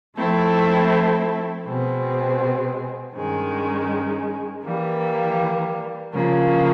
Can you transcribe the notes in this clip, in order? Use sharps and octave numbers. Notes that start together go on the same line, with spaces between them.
F3 A3 C4 E4 A4
B2 G#3 C4
G2 D#3 G#3 C#4
E3 G3 A#3
C#3 F3 A#3